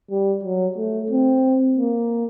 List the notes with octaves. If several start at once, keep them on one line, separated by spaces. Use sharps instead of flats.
G3
F#3
A3
C4
A#3